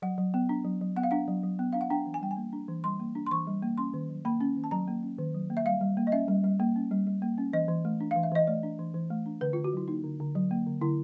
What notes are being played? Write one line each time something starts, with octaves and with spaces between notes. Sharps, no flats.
F#3 F#5
F#3
B3
D4
F#3
F#3
B3 F#5
F5
D4 F#5
F#3
F#3
B3
D4 F5
F#5
D4 G5
E3
G#5
G3 G5
G#5
A#3
D4
E3
G3 C6
A#3
D4
C6
E3 C#6
G3
A#3
C#4 C6
D#3
F#3
A#3 B5
C#4
D#3
A5
F#3 A#5
A#3
C#4
D#3
F#3
A#3
E5
G3 F5
G3
A#3
D#5
C#4 E5
G3
G3
A#3
C#4
G3
G3
A#3
C#4
E3 D#5
E3
A3
D4
F5
E3
E5
E3 D#5
A3 D5
D4
E3
E3
A3
D4
D3 B4
D3 F4
F#4
F#3 E4
A#3 D#4
D3
D3
F#3
A#3
D3
D3 E4